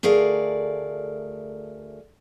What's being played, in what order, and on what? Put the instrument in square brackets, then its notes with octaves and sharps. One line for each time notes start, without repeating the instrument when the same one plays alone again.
[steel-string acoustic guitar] D2 A3 G#4 A#4 D5 F5